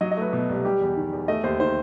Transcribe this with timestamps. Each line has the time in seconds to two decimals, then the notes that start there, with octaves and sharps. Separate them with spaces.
0.01 F#3 D#5
0.11 D#5
0.17 A3 B4
0.33 B2
0.49 C2
0.65 G3 G4
0.81 E2
0.96 D#3
1.12 E2
1.28 A3 D#5
1.44 D#2 C5
1.60 D#3 C5